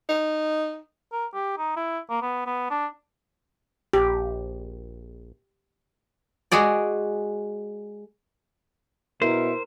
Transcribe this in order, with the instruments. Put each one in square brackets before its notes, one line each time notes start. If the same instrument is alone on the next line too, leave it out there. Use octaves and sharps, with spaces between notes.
[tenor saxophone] D#4
[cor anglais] A#4
G4
D#4
E4
A#3
B3
B3
D4
[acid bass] A#1 [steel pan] G4
[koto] G#3 F#4 G#4 D5
[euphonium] B2 [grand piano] E4 [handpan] A#4 [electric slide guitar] C5